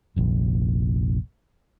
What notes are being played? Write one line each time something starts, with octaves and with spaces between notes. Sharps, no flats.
F1 A#1